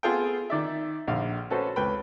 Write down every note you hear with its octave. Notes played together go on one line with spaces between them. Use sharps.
B3 F4 G#4 A4 F5 G5
D#3 D5 E5
A#1 D3 F5
C#4 F#4 A4 B4 C5
C#2 B4 G5 B5